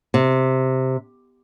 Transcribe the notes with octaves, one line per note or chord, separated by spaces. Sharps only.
C3